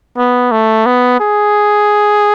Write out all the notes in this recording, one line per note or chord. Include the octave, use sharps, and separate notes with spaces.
B3
A3
B3
G#4